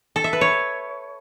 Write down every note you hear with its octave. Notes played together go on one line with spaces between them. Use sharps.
A4
E5
B4
C#5